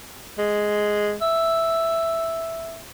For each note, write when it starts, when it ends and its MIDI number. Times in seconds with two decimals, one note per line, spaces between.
0.38 1.15 56
1.21 2.79 76